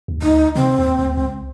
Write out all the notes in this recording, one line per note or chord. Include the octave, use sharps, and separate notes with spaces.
D#2
D2 D#4
C3 C4
D#2
D2
C#2